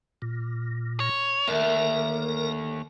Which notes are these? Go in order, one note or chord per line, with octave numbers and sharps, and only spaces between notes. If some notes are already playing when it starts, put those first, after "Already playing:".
A#2
C#5
D#2 D3 A3 A#4